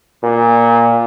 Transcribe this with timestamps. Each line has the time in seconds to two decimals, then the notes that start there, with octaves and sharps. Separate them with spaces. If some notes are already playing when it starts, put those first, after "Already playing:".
0.23 A#2